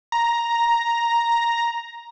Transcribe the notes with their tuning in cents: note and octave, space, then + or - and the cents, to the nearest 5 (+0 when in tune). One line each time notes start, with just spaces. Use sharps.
A#5 +5